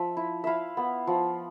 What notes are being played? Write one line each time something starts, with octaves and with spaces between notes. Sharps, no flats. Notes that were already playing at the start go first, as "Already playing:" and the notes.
Already playing: F3 E5
E4
E4 E5 F5
B3
F3